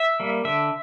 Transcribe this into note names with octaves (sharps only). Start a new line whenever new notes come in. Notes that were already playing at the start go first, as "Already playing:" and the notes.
Already playing: E5
G3 A#3
D3 E5